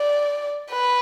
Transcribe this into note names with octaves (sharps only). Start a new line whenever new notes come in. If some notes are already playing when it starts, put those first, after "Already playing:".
Already playing: D5
B4